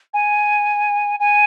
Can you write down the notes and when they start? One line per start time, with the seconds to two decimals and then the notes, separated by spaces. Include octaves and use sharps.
0.13 G#5
1.19 G#5